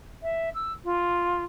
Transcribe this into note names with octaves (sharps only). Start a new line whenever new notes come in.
E5
E6
F4